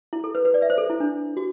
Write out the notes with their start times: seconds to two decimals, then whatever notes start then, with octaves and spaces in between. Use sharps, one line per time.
0.13 E4
0.24 A4
0.35 B4
0.45 B4
0.54 D5
0.62 E5
0.70 C5
0.78 A4
0.90 E4
1.00 D4
1.37 F#4